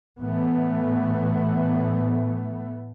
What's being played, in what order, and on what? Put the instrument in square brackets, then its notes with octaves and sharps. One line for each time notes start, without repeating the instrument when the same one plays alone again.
[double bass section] A2 E3 A3 B3